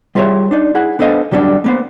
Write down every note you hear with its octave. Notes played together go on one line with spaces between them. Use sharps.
G3 F4 G#4 B4 C#5 E5
D4 D#4 D5
E4 G#4 F#5
B3 D4 A4 C5 D#5 F5
D3 F#3 G3 C#4 D4
A#3 B3 C5